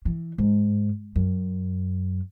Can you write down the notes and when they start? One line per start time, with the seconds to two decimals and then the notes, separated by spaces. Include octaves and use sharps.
0.05 E3
0.38 G#2
1.16 F#2